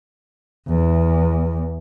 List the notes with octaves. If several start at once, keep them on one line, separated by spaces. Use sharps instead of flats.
E2